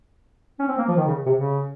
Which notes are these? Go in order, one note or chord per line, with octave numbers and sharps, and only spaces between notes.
C#4
C4
A#3
F3
D#3
C#3
C3
C#3